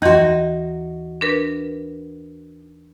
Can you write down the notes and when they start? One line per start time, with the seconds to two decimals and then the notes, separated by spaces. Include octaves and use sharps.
0.02 D#2 E3 D#4 F#4 C6
1.21 D4 A#4 B4